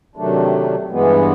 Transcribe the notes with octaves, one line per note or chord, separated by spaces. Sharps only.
C3 D#3 F#3 A3 D4
G2 E3 G#3 B3